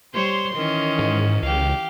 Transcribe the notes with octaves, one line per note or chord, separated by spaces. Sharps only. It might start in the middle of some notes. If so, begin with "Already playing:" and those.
G3 C5 C#5 C6
D#3 E3 C#4
G#2
C#2 G4 F5